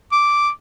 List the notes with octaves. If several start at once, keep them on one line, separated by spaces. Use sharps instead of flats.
D6